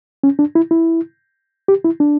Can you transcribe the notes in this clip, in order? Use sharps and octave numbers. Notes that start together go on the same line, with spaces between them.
C#4
D4
E4
E4
G4
E4
D4